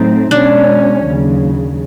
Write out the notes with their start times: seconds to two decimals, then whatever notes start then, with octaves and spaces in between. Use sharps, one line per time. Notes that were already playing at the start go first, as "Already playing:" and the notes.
Already playing: A2 F#3 A3 C4 D#4
0.31 B2 G#3 C#4 D4
1.03 D#2 C#3 F#3